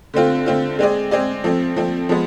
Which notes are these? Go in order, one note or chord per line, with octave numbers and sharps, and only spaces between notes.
D3 A3 C4 F4
D3 A3 C4 F4
G#3 C4 G#4 D5
G#3 C4 G#4 D5
F3 A3 C4
F3 A3 C4
F3 G#3 B3